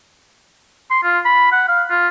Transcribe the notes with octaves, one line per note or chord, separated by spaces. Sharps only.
C6
F4
B5
F#5
F5
F4